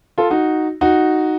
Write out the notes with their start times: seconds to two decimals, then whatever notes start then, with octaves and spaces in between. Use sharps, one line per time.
0.18 F4 A4
0.30 D#4 F#4
0.81 D#4 F#4